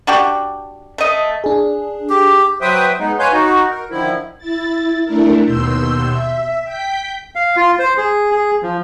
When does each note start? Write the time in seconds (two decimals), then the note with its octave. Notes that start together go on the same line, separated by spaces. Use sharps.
0.07 D4 F#4 G4
0.98 A3 D#5
1.44 D4 G#4
2.10 G4
2.61 F#3 B4 C5 E5 G5 D#6
2.99 G#3 B3 D#4
3.19 B4 C#5 F5 G#5 C6 G6
3.32 D#4 F#4
3.70 A#4
3.90 D3 D#3 F3 E4
4.38 E4 A6
5.05 A3 D4 E4 A#4
5.44 D#2 B2 C6 E6 G6
6.09 E5
6.64 G5 G6 B6
7.35 F5
7.56 F4
7.79 C5
7.97 G#4
8.32 G#4
8.62 F3